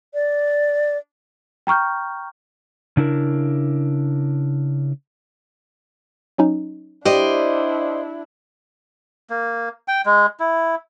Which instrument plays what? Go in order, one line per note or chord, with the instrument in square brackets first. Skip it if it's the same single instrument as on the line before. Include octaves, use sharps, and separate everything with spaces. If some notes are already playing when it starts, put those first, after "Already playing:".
[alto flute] D5
[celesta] G5 A#5 C#6 F6 G6
[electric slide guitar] C#3 D4 E4 A#4
[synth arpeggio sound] F#3 C#4 D#4
[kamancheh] D4 E4 [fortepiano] G4 [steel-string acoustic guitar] C5 D5 D#5
[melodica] A#3
G5
G#3
E4